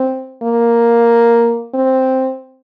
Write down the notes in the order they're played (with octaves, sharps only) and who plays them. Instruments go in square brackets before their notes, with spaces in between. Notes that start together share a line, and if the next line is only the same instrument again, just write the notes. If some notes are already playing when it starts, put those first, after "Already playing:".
Already playing: [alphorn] C4
A#3
C4